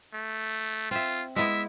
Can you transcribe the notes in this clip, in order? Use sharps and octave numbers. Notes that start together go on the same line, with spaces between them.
A3
C4 F4 E5
G#3 B3 E4 E5